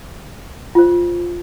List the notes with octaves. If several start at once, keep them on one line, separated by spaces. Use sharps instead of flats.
F4 C5